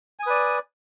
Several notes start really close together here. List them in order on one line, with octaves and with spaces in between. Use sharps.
G#5 D#6 B4 D5